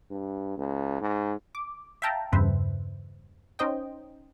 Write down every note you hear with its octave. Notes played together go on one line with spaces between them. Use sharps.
G2
C#2
G#2
D6
E5 F5 G5 A5 A#5
E2 G2 C#3 B4 C5 E5
C#4 D#4 C5 D#5 G5